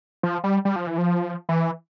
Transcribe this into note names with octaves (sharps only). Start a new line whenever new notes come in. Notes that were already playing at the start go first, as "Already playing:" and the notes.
F3
G3
G3
F3
E3
F3
E3